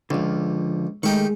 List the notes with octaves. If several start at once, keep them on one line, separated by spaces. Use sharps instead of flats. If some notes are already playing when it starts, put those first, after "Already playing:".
C#2 D3 F3
D#3 G#3 A3 D#4 G4 C#6